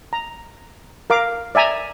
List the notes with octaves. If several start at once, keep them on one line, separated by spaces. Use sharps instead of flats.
A#5
A#4 F5 D6
D5 E5 G#5 A#5